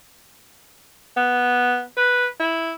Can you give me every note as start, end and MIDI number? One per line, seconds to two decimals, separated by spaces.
1.17 1.83 59
1.97 2.27 71
2.40 2.73 64